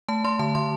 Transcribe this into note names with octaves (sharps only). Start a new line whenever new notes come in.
A3 A5
A3 C6
D3 A5
D3 C6